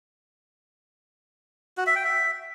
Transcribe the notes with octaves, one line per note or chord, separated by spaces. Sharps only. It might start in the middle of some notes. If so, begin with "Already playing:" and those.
F#4
E5
G5
E5